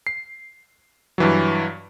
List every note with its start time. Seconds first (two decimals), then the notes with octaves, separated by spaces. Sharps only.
0.07 C7
1.18 G2 E3 F#3